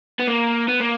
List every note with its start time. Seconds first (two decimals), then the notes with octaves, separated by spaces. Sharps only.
0.20 B3
0.27 A#3
0.68 B3
0.80 A#3